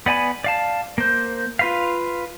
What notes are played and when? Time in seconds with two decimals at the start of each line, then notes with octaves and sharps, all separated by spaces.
0.06 B3 D5 G#5 B5
0.44 D5 F5 A5
0.98 A#3 C5
1.59 F4 B4 F5